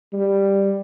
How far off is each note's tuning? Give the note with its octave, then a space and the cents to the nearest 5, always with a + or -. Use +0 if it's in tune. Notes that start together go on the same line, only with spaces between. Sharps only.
G3 +5